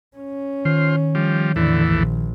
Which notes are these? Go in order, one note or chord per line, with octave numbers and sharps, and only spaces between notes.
C#4
D#3 F4 C5
F3 G3
E2 A2 D3 E3
A#1